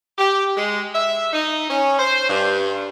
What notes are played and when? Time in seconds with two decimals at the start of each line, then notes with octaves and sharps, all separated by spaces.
0.18 G4
0.57 G#3
0.94 E5
1.33 D#4
1.69 C#4
1.99 C5
2.29 G2